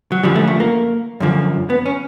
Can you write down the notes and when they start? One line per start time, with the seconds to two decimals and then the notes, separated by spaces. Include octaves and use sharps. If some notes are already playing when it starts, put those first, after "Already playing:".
0.12 F#3
0.23 F#2 D3 F3 G3
0.36 A3
0.47 A3
0.60 A#3
1.20 F#2 D3 F3
1.70 B3
1.86 C#4